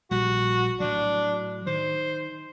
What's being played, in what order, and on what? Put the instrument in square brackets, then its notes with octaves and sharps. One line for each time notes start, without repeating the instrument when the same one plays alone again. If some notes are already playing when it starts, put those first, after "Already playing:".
[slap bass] A#1 G3 [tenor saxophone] F#4
[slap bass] A2 F#3 [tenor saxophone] D4
[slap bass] D#3 [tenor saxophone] C5